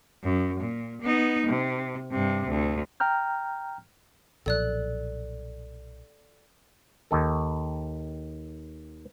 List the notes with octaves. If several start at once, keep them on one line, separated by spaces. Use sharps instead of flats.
F#2
A#2
B3 D#4
C3
G2 C3
D2
G5 A#5 F6 G6
B1 A#2 F3 A4 D5 F#6
D#2 D#3 A4